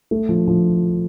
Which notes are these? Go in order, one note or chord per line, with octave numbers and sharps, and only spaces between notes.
A3
F3
F3